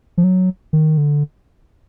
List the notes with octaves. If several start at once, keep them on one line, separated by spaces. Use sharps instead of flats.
F3
F#3
D#3
D3